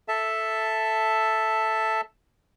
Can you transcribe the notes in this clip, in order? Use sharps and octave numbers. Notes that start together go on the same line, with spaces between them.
A4 E5 A5